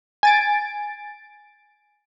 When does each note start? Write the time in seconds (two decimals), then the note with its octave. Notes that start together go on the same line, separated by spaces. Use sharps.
0.23 G#5 A6 D7